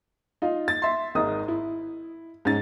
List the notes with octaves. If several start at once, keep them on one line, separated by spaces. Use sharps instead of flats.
D#4 F4
A6
E5 C6
G#1 G#2 A#4 D#5 D#6
E4
G#2 C#4 A6